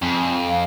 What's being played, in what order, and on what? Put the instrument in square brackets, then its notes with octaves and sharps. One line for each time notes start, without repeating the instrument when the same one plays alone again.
[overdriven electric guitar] F2 [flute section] G#5
[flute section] F5